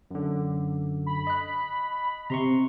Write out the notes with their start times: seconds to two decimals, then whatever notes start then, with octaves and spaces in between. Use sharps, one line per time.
0.11 F#2 D3
1.06 B5
1.27 D#5 F#6
2.30 C3 A#5 C6 C#6